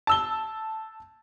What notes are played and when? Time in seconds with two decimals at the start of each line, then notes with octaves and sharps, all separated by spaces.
0.07 A5 E6 G7